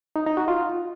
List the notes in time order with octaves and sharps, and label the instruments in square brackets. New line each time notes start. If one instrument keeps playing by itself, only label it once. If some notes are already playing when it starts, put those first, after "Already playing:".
[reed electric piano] D#4
D#4
F#4
F4